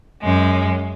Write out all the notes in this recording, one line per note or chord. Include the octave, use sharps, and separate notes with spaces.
F#2 G#3